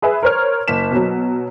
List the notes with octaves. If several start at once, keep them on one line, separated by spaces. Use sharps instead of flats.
G#4 B4 E5
A#4 C5 C#5 F6
F#1 B6 E7
B2 F#3